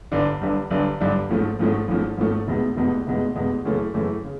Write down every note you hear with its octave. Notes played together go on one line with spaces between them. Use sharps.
G1 G2 D3
G1 G2 D3
G1 G2 D3
G1 G2 D3
G#1 G#2 F3 A3 C#4
G#1 G#2 F3 A3 C#4
G#1 G#2 F3 A3 C#4
G#1 G#2 F3 A3 C#4
F1 E2 B2 G#3
F1 E2 B2 G#3
F1 E2 B2 G#3
F1 E2 B2 G#3
F#2 C#3 E3 A3
F#2 C#3 E3 A3
C#3